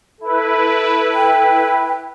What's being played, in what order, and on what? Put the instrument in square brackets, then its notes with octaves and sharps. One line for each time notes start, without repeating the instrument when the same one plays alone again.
[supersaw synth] E4 B4 [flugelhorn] A4
[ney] G5